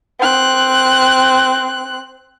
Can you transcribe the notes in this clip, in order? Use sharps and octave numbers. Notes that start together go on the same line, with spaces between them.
C4 F#6